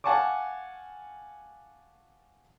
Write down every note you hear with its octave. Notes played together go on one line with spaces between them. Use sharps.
F5 F#5 G#5 A5 C#6 D6